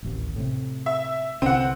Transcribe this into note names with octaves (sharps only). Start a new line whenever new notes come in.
D1 A1 D#2
A2 C3
E5
C2 D3 C4 F#5